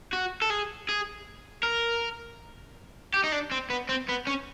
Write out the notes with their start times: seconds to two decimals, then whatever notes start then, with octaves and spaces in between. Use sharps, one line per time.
0.13 F#4
0.42 A4
0.50 G#4
0.89 G#4
1.63 A#4
3.14 G4
3.24 D#4
3.32 D4
3.51 C4
3.70 B3
3.89 C4
4.08 B3
4.27 C#4